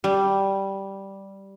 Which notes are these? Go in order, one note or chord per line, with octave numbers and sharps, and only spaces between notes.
G3